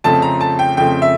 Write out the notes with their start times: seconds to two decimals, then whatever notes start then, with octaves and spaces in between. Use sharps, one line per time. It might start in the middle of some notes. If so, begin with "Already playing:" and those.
0.04 F2 C#3 F3 A3 C4 A5
0.22 A#5
0.41 A5
0.59 G5
0.77 F2 C#3 F3 A3 C4 G5
1.02 E5